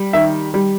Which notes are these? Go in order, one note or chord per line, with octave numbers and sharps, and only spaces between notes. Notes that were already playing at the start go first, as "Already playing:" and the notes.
Already playing: G3
D#3 E5
G3